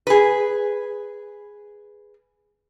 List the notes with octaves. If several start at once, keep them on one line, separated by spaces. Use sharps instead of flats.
G#4 B4